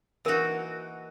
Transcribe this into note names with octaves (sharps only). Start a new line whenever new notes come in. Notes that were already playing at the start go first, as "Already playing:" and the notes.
E3 A#3 D#4 F#4 A#4